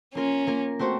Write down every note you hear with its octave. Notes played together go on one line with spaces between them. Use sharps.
A#3 C#4 F4 A#4
A#3 F4 A#4
A3 C4 F#4 C5